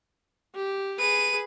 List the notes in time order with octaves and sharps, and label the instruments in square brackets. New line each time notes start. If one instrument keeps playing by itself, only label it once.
[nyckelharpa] G4
[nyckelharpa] G#4 B4 [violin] D#7